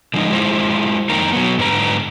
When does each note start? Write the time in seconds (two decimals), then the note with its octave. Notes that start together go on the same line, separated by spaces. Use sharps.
0.14 D3 F3 G#3 B3 D#4
0.32 G#3 E4 F4 C5
1.09 F2 A#3 D#4 A#4 A#5
1.33 F#3 B3
1.58 G#2 D3 B4 A#5